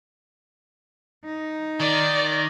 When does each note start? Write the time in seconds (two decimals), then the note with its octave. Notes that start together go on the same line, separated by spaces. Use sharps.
1.25 D#4
1.80 D#3 D5